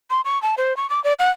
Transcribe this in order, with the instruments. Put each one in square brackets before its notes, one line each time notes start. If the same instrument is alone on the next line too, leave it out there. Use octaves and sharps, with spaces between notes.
[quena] C6
C#6
A5
C5
C#6
D6
D5
F#5